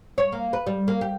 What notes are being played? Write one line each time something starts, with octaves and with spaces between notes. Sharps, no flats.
C#5
A#3
B4
G3
A#3
G4